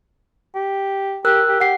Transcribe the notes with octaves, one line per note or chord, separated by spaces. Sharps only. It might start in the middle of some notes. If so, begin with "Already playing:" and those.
G4
G4 A#4 E6 F#6
G4
G4 F#5 C7